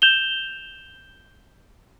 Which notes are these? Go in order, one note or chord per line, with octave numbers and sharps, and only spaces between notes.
G6 E7 F7 G7